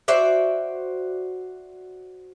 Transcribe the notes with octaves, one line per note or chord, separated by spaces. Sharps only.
F#4 C5 D5 E5